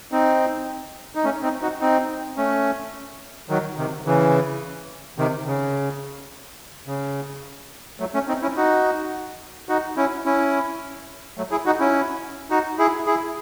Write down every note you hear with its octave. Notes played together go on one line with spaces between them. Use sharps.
C4 D#4
D#4
A3 C#4
C4 D#4
D#4 F#4
C4 D#4
A3 C#4
D#3 F#3
C3 D#3
C#3 E3
C3 D#3
C#3
C#3
F#3 A3
A3 C#4
C4 D#4
C#4 E4
D#4 F#4
D#4 F#4
C#4 E4
C#4 E4
F#3 A3
E4 G#4
D#4 F#4
C#4 E4
D#4 F#4
E4 G#4
E4 G#4